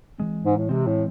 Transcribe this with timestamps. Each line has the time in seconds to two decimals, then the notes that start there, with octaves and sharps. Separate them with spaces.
0.18 E3 G#3 C4
0.45 G#2
0.57 A2
0.69 C3 E3 G#3 C4
0.87 A2